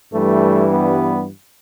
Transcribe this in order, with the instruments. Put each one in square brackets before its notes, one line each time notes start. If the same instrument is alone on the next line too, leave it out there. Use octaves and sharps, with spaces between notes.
[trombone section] G2 E3 G3 A3
B3